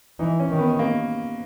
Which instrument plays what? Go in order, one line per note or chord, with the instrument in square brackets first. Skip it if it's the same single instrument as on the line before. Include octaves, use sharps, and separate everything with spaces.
[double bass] E3 [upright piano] D#4
[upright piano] C#4
[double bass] D#3
[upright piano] B3
A#3